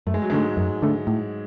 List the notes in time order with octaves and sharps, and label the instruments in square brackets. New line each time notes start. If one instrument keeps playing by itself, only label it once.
[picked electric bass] F#2 [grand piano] A3
[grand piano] G#3
F#3
[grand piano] G#2 G#3 [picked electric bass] D3 A3
[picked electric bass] F#2
D3 A3
A2